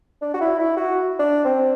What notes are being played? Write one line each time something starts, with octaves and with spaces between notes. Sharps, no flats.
D4
F#4
E4
E4
F#4
D4
C4